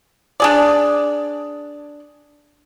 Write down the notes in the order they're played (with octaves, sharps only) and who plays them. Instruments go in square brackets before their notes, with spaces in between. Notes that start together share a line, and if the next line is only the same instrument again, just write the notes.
[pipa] D4 G#4 D5